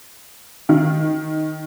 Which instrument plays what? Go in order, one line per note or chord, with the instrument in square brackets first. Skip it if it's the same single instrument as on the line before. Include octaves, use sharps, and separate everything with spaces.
[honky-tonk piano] D#3